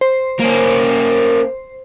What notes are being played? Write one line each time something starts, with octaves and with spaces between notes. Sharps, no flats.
C5
A#3 C#4